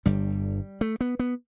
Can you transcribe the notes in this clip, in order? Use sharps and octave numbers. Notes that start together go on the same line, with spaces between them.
G1 G2 D3 G3
A3
B3
B3